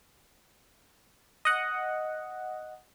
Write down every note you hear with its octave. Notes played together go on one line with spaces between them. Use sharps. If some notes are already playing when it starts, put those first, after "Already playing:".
D#5 F#5